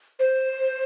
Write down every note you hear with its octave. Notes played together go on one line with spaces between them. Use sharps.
C5